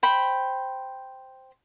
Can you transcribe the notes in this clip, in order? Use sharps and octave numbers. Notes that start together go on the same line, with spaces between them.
C5 G5 B5